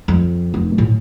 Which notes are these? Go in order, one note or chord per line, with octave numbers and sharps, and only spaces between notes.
F2
F1
A2 C#4